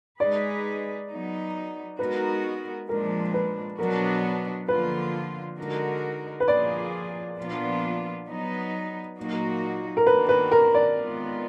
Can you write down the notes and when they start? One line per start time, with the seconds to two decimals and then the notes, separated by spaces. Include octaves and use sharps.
0.20 G#3 D#4 G#4 B4 D5
1.10 F#3 B3 D#4
1.99 G#3 B3 D#4 F#4 A#4 B4
2.88 A#2 F3 G#3 D4 A#4
3.34 B4
3.79 B2 F#3 B3 D4 F#4 A#4
4.68 D3 F3 A#3 F4 B4
5.58 D3 G#3 D#4 F#4 A#4
6.40 B4
6.47 A#2 F3 A#3 F4 G#4 D5
7.37 A#2 F3 B3 D4 F4
8.27 F#3 B3 D#4
9.17 A#2 F#3 A#3 D#4 F#4
9.97 A#4
10.07 D#3 A#3 D4 F#4 B4
10.29 B4
10.51 A#4
10.75 D5
10.96 D#3 G#3 B3 F4